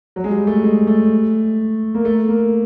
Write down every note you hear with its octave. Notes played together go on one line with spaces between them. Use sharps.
F#3
G#3
G3
A3
G#3
A3
A#3
A3
A#3